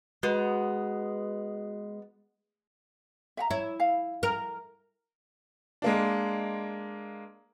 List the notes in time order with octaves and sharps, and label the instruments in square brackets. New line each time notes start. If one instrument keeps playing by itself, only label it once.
[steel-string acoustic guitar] G#3 [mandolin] B3 [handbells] F#4
[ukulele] E5 F#5 A#5
[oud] E4 [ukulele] C#5
[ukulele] F5
[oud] A#4
[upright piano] G#3 A#3 D4